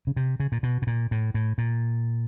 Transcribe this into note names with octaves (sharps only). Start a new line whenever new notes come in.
C#3
C3
C#3
A#2
B2
B2
A#2
A2
A2
A#2